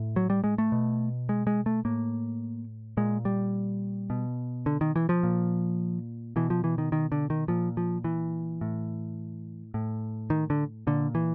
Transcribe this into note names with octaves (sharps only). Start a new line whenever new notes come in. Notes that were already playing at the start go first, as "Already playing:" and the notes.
Already playing: A2
F#3
G3
G#3
A3
B2
G#3
G#3
A3
A2 A#3
A#2 G#3
G3
B2
D3
D#3
E3
F3
A#2
B2 E3
F3
E3
D#3
D#3
D3
D#3
A#2 F3
F3
E3
A2
A2
D#3
D3
A#2 D3
E3